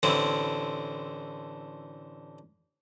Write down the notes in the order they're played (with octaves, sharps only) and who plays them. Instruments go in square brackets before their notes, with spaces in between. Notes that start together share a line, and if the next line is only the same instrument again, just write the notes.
[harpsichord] A1 D3 C4 E4